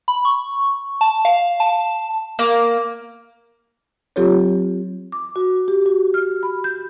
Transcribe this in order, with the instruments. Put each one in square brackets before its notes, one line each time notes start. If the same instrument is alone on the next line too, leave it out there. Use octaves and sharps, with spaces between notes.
[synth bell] B5
C#6
A5
F5
A5
[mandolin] A#3
[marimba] F#3 C4 F4 G4 A4 C#5
D6
F#4
G4
F#4
F6
B5
G6